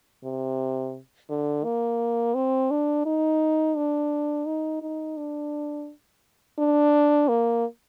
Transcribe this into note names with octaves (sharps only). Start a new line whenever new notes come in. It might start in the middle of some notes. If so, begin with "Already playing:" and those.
C3
D3
A#3
C4
D4
D#4
D4
D#4
D#4
D4
D4
A#3